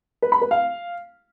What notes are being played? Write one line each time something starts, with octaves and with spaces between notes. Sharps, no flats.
B4
B5
B4
F5